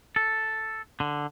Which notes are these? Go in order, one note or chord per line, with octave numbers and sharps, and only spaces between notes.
A4
D3